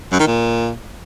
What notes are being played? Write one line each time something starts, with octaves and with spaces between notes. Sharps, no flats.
F#2
D#3
A#2